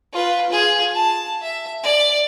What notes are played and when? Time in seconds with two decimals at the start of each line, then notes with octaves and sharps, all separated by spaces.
0.13 F4 B4
0.49 F4 G#4
0.95 A5
1.42 E5
1.83 D5